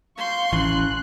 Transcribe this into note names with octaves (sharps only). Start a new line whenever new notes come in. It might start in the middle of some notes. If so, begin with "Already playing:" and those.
F5 C6 C#6 G6
A1 E3 C#4 F#6